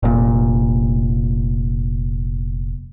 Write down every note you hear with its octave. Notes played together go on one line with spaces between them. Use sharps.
F1 A#2